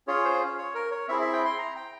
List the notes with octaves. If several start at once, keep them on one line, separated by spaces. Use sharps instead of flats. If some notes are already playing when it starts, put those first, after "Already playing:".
C#4 F4 G#4 C#5
C5
C#5
A#4
C#5
C4 E4 G#4 E5
E5
G5
C6
A#5
G5